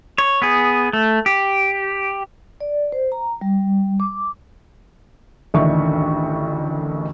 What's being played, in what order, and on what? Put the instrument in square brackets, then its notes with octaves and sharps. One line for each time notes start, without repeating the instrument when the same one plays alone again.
[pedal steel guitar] C#5
B3 G#4
A3
G4
[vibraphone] D5
C5
A#5
G3
D6
[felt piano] A1 D2 D#3 D4 E5 C#6